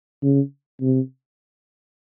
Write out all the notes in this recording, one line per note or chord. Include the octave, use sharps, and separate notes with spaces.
C#3
C3